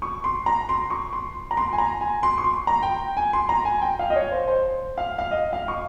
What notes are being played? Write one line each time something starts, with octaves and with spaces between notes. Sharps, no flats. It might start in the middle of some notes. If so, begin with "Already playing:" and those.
C#6
C6
A#5
C6
C#6
C6
A#5
C6
G#5
A#5
G#5
C6
C#6
C6
A#5
G5
G#5
C6
A#5
G#5
G5
F5
D#5
C#5
C5
C5
F5
F5
D#5
F5
C#6